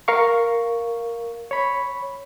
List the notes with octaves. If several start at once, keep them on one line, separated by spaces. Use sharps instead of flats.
A#4 F5 C#6
C#5 B5